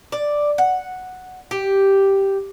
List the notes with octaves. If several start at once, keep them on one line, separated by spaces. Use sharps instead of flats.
D5
F#5
G4